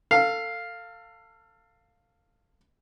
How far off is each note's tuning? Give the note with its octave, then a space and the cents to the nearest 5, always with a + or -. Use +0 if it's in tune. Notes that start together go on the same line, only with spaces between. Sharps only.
A4 +30 F5 +0